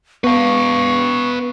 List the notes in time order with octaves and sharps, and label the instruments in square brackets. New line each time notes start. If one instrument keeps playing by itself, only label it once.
[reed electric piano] B3 [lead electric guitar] B4 F5 [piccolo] C#6